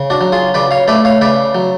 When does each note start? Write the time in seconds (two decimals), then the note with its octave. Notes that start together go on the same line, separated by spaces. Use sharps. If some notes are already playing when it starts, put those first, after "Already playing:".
Already playing: C#3
0.10 D4 F#4
0.21 F#3
0.32 F4 G#4
0.54 C#3 B4 D5
0.71 C#5 F5
0.88 A3 B4 D5
1.05 C#5 F5
1.21 C#3 B4 D5
1.55 F#3